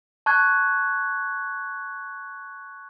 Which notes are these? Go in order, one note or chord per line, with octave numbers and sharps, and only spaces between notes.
A5 C#6 F#6 G#6